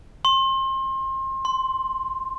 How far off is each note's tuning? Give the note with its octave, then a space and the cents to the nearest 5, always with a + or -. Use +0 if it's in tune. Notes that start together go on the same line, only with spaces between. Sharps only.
C6 +30
C6 +0